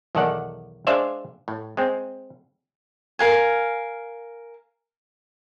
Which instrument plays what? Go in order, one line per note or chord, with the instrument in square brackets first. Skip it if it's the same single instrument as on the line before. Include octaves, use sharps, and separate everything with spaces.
[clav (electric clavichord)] B1 E2 D#3 A4 D5 F#5
G#3 D4 C5 D5 E5 F5
A2
G#3 C4
[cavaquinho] A#4 F5 G#5